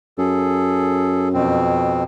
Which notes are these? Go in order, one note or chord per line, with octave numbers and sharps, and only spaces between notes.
F#2 G#4 A4
F2 B2 C4